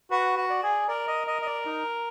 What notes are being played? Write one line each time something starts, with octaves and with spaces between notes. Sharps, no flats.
F#4 B4
F#4
D5
G#4
A#4 D5
D#5
D#5
D#5
D5
D#4